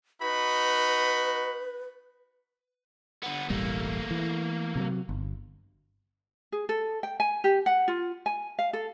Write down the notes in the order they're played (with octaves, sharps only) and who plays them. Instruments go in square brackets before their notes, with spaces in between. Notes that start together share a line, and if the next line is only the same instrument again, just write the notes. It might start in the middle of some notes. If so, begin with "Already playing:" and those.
[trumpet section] D#4 F#4 B5 [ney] B4
[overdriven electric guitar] D3 B3
[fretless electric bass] E1 A1 G3 [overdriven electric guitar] A3 A#3
[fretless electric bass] E3
C3 E3 F#3
G1
[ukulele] G#4
A4
G5
G#5
G4
F#5
F4
G#5
F5
A4